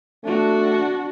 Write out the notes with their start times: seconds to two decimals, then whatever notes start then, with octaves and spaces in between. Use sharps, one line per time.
0.24 A3 D4 F#4